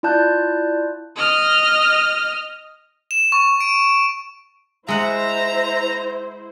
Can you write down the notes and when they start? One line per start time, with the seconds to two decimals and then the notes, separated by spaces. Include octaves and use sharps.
0.03 E4 F4 D5 A5 F#6 G6
1.16 D#5 F6
3.11 E7
3.32 C#6
3.61 D7
4.88 G#3 E4 C5 E5 F#5 A#5